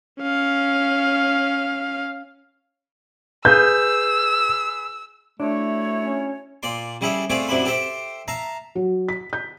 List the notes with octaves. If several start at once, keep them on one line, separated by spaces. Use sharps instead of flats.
C#4 F5
G#4 B4 E6 G6
A3 D4 E4 F#4 C#5
C#4
A#2 D5 C6
C#3 G3 E4 G#4 A4
A3 C4 F4 G#4 D5
F#2 C3 D4 E4 B5
G4 A4 C5 E5 G5
E5 F5 A5 A#5
F#3
B6
G6